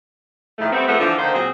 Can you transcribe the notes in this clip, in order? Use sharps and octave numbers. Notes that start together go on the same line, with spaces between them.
A2 D#3 F3 G#3 A3
G3 A3 B3 C4
F3 A3 B3 G#4 B4 C5
D3 E3 F3
D3 D#3 A#3 C5
A#2 F#3 C4 G#4